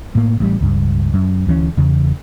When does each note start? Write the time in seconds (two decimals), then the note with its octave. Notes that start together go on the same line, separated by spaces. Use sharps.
0.15 A2 A#3
0.40 A1 G3
0.61 C#2 G2
1.14 F#2
1.47 D2 E3 C#4
1.77 E2 C#3